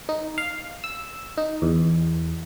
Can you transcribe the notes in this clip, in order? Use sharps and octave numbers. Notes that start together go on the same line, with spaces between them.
D#4
F5
E6
D#4
E2